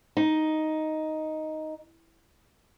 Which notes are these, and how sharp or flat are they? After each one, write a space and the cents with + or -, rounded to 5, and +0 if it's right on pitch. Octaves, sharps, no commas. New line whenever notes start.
D#4 +5